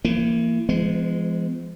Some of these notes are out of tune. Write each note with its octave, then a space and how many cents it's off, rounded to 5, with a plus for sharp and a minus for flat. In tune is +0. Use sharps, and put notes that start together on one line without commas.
E3 +35 A#3 -20
F3 -35 G#3 +0 B3 +30